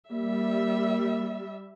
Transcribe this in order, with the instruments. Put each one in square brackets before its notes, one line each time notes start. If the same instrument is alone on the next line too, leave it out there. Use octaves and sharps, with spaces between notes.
[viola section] G3 E5 [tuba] A#3